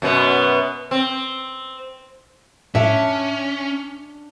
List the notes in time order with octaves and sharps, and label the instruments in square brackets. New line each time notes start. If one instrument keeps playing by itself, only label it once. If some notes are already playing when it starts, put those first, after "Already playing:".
[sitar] F#2 B2 B3
C4
[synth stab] A2 [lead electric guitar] C#4 [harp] D4 [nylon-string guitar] E5